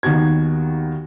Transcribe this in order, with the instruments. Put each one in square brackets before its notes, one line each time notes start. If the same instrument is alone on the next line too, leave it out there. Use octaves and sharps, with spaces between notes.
[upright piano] D#2 D#3 B3 F#4 G#6